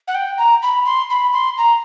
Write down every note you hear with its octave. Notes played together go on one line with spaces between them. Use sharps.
F#5
G5
A#5
B5
C6
B5
C6
A#5